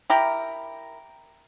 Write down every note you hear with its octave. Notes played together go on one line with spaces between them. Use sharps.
E4 G4 A#4